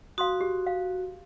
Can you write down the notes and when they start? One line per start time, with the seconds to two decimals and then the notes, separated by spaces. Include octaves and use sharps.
0.18 F#4 F5 C6 D#6
0.41 G4
0.67 F5